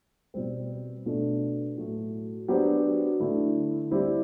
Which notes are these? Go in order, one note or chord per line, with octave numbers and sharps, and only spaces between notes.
B2 G3 C4
B2 A3 D4 A4
A2 F#3 A3
F#3 B3 D4 G4 C5
D3 A3 E4
G3 C4 E4 G4 C5